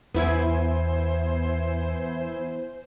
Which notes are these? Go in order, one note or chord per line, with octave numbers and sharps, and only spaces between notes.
E2 E3 B3 E4 C5 G#5